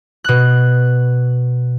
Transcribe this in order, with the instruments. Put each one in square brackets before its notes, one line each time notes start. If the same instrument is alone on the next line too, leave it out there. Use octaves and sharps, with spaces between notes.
[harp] B2 F#6